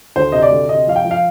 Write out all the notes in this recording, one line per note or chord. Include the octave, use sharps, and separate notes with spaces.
D2 C5
C3 D#5
D5
D2
C3 D#5
F3 F5
G5
F3
F5